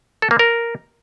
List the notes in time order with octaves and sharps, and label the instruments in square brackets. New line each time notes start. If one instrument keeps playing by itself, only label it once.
[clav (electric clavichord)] A4
A#3
A#4